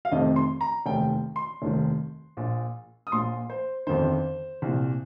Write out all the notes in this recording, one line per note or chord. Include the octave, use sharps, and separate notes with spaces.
F5
F1 F2 C3 D#3 D#5
C6
A#5
F1 D#2 D#3 G5
C6
F1 D#2 D#3
A#1 A#2
D#6
A#1 A#2 C6
C5
G1 F2 D#3 C5
C2 A#2